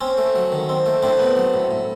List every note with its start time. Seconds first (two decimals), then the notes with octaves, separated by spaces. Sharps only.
0.01 C4 C#4
0.18 A3
0.35 F#3
0.52 D#3
0.69 C4
0.86 A3
1.02 A2 C4 D4
1.19 B3
1.36 F#3
1.54 A2
1.71 A2